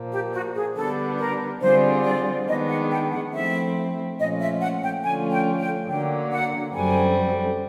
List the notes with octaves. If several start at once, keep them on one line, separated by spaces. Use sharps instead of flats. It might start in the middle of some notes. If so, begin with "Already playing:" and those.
Already playing: A#2 F3 A#3
G4
F#4
G#4
D3 G3 B3 D4 A4
A#4
D3 G3 C4 F4 G#4 C5
D5
D#3 G#3 B3 D4 D#5
F#5
G5
F#5
F3 A3 C4 E4 E5
A#2 F3 A3 C#4 F4 D#5
E5
F#5
G5
D3 F3 A3 C#4 F4 G#5
G5
G5
D3 F#3 A#3 G5
F#5
F#2 D3 G3 C4 G#5